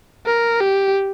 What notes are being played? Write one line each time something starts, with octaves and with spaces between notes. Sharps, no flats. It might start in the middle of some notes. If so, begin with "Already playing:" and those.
A#4
G4